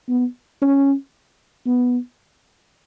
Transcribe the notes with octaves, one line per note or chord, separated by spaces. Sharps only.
B3
C#4
B3